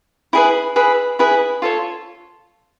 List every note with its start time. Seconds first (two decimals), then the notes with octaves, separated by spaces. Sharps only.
0.33 E4 G#4 B4
0.76 E4 G#4 B4
1.19 E4 G#4 B4
1.62 F4 A4 C#5